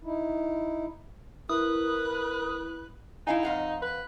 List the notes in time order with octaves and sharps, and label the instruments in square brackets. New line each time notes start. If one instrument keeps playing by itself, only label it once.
[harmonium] D#4 E4
[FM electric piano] E4 [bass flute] A#4 [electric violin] B4 F#6 [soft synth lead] D#6
[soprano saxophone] D#4 [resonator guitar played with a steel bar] E4 F5 G#5
[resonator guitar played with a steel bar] F2 F5 F#5
[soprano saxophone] B4